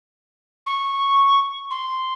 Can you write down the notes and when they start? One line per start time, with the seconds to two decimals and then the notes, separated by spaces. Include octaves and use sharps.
0.66 C#6
1.70 C6